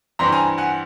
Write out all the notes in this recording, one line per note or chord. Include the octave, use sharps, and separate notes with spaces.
G2 E3 G3 C4 A#5 C6
G#5 A#5
F#5 G#5